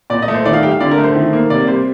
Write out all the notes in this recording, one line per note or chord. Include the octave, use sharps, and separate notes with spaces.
A#2 D5
D#5
A3
C5
D#3 D5
F5
G3 G5
F5
D3 D5
A#4
A3
C5
D#3
A#3
C3 D5
G3 C5